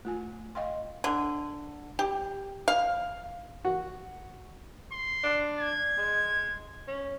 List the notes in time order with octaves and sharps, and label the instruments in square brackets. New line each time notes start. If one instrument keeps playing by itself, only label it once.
[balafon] A3 F4 G#5
D#5 F5 G5 C6
[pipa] D3
G4
F5
[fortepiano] F#4
[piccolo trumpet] C6
[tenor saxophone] D4
[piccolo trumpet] G#6
[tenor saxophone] G#3
C#4